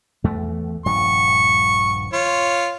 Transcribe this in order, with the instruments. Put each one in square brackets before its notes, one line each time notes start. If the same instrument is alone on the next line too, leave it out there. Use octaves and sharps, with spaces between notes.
[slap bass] E2 A3
[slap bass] D#1 G2 F3 [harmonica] C#6
[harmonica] F4 C#5